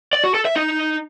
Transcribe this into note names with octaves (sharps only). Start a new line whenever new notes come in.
D5
F#4
A4
E5
D#4